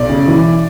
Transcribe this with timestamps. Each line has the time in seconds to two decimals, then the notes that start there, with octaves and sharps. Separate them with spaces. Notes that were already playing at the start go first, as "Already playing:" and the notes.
Already playing: B1 D5
0.09 C#3
0.28 E3